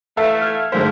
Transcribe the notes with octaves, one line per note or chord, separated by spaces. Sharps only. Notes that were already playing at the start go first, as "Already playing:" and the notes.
E3 A3 A4 E5 F5
F6 G#6
G1 G#2 A3 A#3 C5 B6